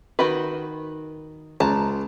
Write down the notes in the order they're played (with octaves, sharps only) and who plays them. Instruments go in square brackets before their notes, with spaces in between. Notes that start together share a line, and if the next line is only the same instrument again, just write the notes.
[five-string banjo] D#3 F#4 B4
[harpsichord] C#2 [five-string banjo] A5 A#5